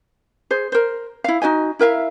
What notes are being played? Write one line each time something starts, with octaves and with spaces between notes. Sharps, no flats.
G#4 C5
A#4 C5
E4 F5
D#4 F#4 D#5 G#5
E4 A#4 E5 F5